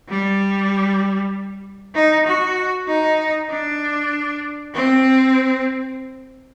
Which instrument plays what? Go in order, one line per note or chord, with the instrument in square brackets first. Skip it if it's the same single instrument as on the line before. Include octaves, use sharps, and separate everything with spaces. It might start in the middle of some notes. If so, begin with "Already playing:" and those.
[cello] G3
D#4
F#4
D#4
D4
C4